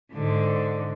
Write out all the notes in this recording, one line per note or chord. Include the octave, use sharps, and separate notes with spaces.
G#2 D3